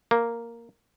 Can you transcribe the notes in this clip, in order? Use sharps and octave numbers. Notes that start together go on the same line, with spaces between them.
A#3